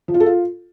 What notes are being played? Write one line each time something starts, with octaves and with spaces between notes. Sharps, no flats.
F3
F4
A4
F4